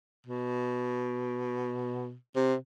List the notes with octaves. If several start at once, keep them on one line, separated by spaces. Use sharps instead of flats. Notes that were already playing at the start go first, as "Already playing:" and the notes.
B2
C3